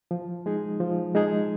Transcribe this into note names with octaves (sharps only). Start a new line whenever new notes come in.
F3
G#3 D#4 G#4
F3
G#3 D#4 G#4